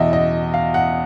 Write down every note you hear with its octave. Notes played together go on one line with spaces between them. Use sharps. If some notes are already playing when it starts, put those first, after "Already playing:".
Already playing: E2 B2 D#5 E5
D#5
F5
F#5